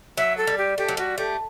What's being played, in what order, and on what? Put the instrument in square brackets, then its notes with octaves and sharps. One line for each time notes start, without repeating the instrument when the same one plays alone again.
[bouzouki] F#3 [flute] E5
[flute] A4
[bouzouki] G3
[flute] G4
[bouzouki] A3 [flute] G4
[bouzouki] F#3
[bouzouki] G3 [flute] F#4
[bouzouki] A3 [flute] G4